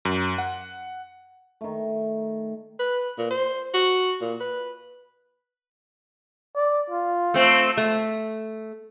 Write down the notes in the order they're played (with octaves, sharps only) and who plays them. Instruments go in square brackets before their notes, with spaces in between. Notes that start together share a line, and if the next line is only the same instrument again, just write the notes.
[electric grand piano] F#2
F#5
[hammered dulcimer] D#3 A3
[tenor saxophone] B4
A#2
C5
F#4
A#2
B4
[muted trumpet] D5
F4
[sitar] A3 C4
[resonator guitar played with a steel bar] A3